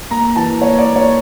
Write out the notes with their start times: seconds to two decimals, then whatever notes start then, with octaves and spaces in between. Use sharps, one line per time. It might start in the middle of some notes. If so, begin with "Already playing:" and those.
0.10 A#3 A#5
0.36 E3 A5
0.61 A#3 C#5
0.79 D5
0.87 A#3
0.96 C#5